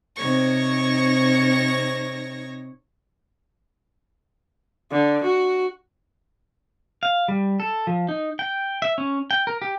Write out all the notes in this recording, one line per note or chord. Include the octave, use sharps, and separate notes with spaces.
C3 C4 D#4 C#5 C#6 A#6
D3
F#4
F5
G3
A4
F3
D#4
G5
E5
C#4
G5
A#4
G4